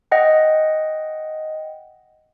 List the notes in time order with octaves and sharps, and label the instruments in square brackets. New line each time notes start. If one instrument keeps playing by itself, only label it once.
[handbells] D#5 F#5 G5